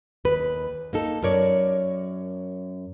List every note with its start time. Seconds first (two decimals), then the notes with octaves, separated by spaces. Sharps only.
0.25 D#2 B4
0.93 A#3 D#4 A4
1.23 F#2 A#4 C#5 D5